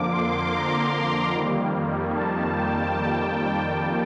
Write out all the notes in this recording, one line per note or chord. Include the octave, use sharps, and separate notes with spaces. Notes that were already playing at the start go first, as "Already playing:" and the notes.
Already playing: F2 D3 F3 A#3 D6
C6
A#5
F2 D#3 G3 A#3
A5
G5